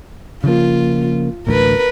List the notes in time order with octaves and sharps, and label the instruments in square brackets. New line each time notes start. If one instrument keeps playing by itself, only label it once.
[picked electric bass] C#3 F3 A#3 [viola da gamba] F4
[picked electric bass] D1 A1 D2 [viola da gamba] A#4 B4